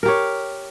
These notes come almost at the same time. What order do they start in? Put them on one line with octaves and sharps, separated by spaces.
A#4 G4 C#5